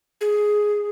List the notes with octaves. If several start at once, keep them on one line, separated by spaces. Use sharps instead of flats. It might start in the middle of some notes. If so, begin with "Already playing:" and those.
G#4